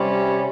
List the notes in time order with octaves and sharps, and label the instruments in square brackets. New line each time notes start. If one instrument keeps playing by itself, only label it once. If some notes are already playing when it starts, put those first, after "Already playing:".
Already playing: [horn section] C3 G3 C#4